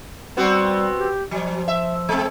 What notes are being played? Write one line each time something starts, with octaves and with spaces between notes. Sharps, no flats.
G3 B3 C4 F#4
G4
F3 F#3
E5
G#3 C4